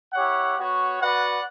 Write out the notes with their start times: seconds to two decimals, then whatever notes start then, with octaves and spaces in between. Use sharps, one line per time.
0.13 E4 G4 C#5 F#5
0.57 B3 F#4 C#5
1.00 F#4 B4 D5 F#5